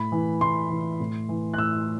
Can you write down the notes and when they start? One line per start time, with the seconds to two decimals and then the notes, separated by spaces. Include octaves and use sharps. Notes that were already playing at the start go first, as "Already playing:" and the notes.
Already playing: A2 B5
0.12 E3
0.41 A2 C6
0.70 E3
1.00 A2
1.29 E3
1.54 F#6
1.58 A2 E6